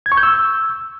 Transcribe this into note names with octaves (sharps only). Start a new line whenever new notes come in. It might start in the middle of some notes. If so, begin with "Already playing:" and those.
G#6
C#6
G6
E6